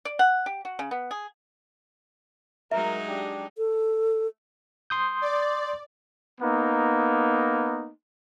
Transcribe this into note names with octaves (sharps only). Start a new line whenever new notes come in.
D5
F#5
G4
F#4
C#3
B3
G#4
F#3 G#3 D#4 A#4 E5
D4 G4
A4
C6 D#6 G6
D5
A#3 B3 D#4